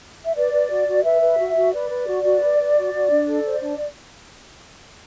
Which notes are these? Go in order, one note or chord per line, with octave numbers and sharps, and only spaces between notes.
E5
B4 D5
B4
F#4
F#4
B4 E5
B4
F#4
F#4
B4 D5
B4
F#4
F#4
B4
B4
F#4
F#4
D4
A4
C5
D4